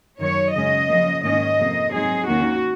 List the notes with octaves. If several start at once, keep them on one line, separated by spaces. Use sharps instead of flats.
F#2 D#3 F#3 C#5
F#2 C#3 G#3 C#4 D#5
C#3 F3 A#3
G#2 D#3 A#3 C#4 D#5
F2 C3 F3 A#3
G#2 F#3 C4 D#4 G#4
D#2 D#3 A#3 C#4 F#4